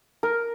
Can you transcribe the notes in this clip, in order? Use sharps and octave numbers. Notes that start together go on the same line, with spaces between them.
A#4